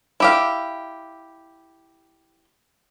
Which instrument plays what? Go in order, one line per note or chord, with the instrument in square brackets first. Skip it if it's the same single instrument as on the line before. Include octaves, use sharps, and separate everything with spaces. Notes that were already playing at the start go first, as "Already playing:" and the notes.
[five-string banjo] E4 G4 F5